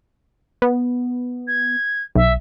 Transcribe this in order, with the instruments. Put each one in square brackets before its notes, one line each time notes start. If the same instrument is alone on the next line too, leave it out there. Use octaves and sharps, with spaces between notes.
[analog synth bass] B3
[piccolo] G#6
[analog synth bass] B1 [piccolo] E5